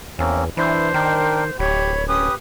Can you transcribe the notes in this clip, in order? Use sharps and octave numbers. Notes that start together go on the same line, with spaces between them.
E2 A#3 C4 C#4
E3 D4 E4 C5
D#3 D4 A#4 G5
D1 G4 C#5 B5
C#4 G4 B4 D#6